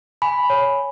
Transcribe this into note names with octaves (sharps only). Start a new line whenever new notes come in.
G#5 B5
C#5